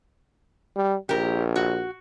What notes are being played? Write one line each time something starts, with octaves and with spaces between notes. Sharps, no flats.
G3
A#1 G4 A#4
F#4